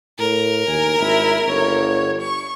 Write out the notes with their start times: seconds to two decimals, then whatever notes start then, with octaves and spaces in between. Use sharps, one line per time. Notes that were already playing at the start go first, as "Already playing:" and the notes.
0.19 A2 A#4
0.68 D#2 G#5
1.00 G#1 E4
1.47 G1 C#5
2.21 C#6